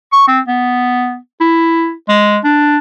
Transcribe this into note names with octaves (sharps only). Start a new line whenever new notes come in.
C#6
C4
B3
E4
G#3
D4